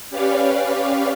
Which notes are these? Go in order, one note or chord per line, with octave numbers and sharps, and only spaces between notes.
C#4 G4 B4 C#5 D5 F5